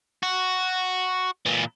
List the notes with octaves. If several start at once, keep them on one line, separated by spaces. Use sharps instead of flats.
F#4
A#2 E3